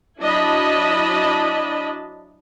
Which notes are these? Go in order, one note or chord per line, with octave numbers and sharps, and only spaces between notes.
F#3 D4 E4 D#5 A5 B5